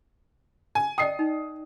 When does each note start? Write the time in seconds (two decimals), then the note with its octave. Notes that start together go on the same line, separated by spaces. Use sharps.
0.75 G#5
0.98 D5 D#5 G5 D#6 C7
1.19 D#4